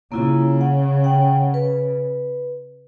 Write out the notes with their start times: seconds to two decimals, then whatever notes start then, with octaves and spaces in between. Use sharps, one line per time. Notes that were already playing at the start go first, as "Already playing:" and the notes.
0.12 C#3 A#3 E4 F4
0.61 F#5
1.04 F#5 G5
1.54 B4